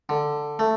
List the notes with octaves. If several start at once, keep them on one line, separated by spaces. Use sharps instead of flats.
D3
A3